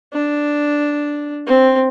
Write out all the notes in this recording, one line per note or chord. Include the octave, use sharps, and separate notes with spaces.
D4
C4